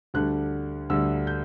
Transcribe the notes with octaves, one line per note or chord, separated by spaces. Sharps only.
D2 D3 G3 F#6
D2 D3 G3 E6
G6